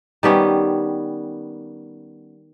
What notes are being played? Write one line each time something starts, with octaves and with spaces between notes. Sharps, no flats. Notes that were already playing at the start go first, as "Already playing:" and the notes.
D#3 G3 B3 C#4